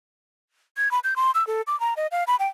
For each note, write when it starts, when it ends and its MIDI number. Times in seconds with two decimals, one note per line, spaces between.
0.77 0.91 92
0.91 0.99 83
1.04 1.14 91
1.16 1.31 84
1.35 1.46 88
1.47 1.62 69
1.67 1.78 86
1.80 1.94 82
1.97 2.07 75
2.11 2.24 77
2.27 2.36 83
2.39 2.47 79